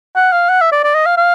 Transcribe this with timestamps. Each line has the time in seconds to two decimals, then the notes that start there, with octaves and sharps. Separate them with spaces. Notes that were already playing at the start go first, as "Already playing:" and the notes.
0.16 F#5
0.32 F5
0.49 F#5
0.61 E5
0.72 D5
0.83 D5
0.95 D#5
1.06 F5
1.17 F5